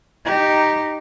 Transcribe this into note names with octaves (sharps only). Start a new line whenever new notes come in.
D#4 G4